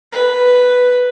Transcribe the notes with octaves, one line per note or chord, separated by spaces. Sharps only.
B4